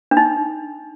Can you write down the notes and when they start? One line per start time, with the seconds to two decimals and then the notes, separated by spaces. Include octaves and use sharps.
0.11 D4
0.17 D#4